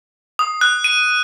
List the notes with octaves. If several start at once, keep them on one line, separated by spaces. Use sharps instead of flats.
D#6
F#6
D#7